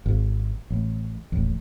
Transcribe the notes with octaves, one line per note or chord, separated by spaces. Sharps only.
G#1
A1
D#1 A1